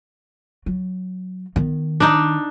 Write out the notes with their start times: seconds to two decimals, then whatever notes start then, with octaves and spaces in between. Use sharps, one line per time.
0.66 F#3
1.56 D#3 B3
2.00 D4 D#4